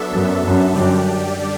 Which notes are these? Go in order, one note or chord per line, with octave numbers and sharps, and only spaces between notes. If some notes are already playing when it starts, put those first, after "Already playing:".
Already playing: F#3 B3 D4 A4 E5
F#2
F#2
F#2 D3 G3 D4 G4 D5